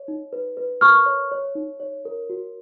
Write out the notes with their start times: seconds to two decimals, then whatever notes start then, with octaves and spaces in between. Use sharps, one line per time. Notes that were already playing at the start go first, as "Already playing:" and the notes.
Already playing: C#5
0.08 D#4
0.33 B4
0.57 B4
0.81 A#4 C#6 F6
1.06 C#5
1.32 C#5
1.55 D#4
1.80 C#5
2.05 A#4
2.30 F#4